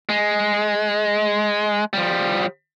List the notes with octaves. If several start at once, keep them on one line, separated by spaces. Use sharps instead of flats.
G#3
F3 G3